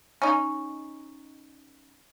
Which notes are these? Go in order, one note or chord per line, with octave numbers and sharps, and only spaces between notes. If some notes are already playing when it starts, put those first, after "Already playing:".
C#4 D#4